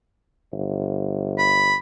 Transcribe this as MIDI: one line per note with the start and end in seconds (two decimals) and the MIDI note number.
0.52 1.75 31
1.38 1.76 83